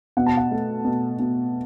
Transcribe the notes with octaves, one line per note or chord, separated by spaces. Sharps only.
B2 F#5
A5
F#5
A3
B2
B2